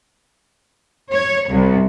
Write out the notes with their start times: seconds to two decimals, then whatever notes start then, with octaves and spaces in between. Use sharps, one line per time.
1.10 C#5
1.49 C2